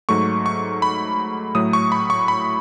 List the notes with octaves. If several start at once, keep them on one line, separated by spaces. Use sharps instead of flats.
G#2 F#3 A3 C#6
C#6
B5
A2 F#3 A3 D#6
C#6
B5
C#6
B5